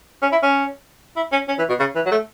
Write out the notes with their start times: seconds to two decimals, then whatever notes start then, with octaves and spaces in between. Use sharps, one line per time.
0.22 C#4
0.32 E4
0.43 C#4
1.17 E4
1.32 C#4
1.48 C#4
1.59 E3
1.69 B2
1.80 C#3
1.95 E3
2.06 F#3
2.12 A3